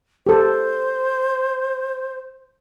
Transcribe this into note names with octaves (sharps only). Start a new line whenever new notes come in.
G4 A4 C5